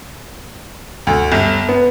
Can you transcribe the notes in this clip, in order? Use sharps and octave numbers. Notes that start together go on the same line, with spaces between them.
D2
G1
B3